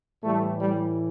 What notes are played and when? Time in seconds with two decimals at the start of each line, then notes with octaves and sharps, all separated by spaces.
0.23 A2 E3 G3 A3
0.58 G3